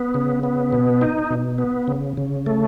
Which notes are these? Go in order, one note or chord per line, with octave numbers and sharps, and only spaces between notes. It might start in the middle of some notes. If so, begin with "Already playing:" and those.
Already playing: B3
C#3
B3
B2
D#4
B2
B3
C#3
C#3
A3